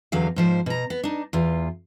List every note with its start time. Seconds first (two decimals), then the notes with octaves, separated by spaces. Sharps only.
0.12 E2 D3 F#3 F5
0.36 G#2 F3 C5
0.66 B2 A#5
0.90 B3
1.03 D4 D#4
1.33 E2 F4